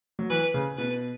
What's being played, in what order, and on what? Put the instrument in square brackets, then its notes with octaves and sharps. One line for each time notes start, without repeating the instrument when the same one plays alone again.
[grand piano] F#3
[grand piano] E3 [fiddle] B4
[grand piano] C#3
[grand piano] B2 [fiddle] B4